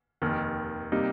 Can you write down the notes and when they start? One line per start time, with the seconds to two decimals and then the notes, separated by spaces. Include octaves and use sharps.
0.22 F1 D#2 D#3
0.92 C3 G3 A#3 D#4